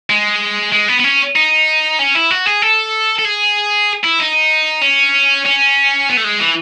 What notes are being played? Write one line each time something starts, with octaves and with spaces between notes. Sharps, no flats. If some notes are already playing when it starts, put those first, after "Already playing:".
G#3
G#3
B3
B3
C#4
D#4
C#4
E4
F#4
G#4
A4
A4
G#4
E4
D#4
C#4
C#4
B3
A3
G#3
E3